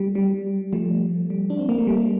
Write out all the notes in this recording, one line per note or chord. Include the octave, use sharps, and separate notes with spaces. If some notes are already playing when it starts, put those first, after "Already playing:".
Already playing: G3
G3
F3 A3
G3
D4
C4
A#3
A3
G3